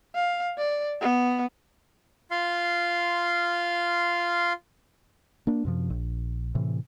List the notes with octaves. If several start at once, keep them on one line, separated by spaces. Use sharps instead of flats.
F5
D5
B3
F4 F5 C6
A#3 D4
F#2 C3 F3
A#1
A2 C3 E3